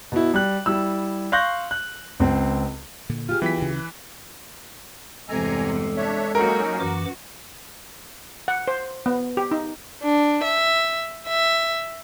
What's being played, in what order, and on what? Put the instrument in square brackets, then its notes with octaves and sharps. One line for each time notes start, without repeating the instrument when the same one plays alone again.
[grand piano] B2 E4
G3 F#6
G3 E4 E6
F5 C6 C#6 F#6 G6 A#6
F#6
C#2 C4
[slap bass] A#2 D3
[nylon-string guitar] F4 G4 G#4 [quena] F6
[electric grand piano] E3 B6 [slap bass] F#3 B3 [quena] G5
[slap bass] D2 C#3
[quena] F#6
[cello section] E2 G2 C3 [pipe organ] G#3 A4 [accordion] G#5 A#5
[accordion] D4 C#5 E5
[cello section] F#3 A#3 F#4 [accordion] C#4 D#4 [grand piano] A#4
[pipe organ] F#2 E3 D6 [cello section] F#4
[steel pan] F#5
C5
B3
G4
D#4
[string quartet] D4
E5
E5